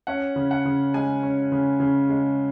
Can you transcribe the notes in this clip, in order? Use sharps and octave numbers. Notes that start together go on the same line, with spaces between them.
C#4 F#5
C#3
F#5
C#3
G#3 G#5
C#4
C#3
C#3
G#3